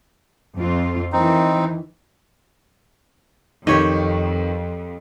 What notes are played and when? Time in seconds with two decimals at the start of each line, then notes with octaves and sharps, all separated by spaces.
0.56 F2 C4 F4
1.13 D#3 E3 C4 D#4
3.67 F2 D#3 G4 C#5 D#5